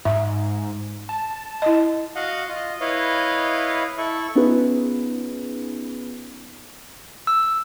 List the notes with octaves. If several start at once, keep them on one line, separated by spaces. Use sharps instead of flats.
G#2 E5
A5
E4 D#5
F#4 D#5 F5 F#5
F4 D#5
E4 B4 C#5 D#5 F5
E4 A4 C#6
B3 C#4 D#4 F4 G#4 B4
E6